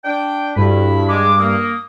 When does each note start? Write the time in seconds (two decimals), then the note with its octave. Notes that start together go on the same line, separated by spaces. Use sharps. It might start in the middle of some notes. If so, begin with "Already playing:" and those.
0.05 D4 G5
0.56 D2 G2 E4 B5
1.09 G#3 D6
1.39 A#3 D#6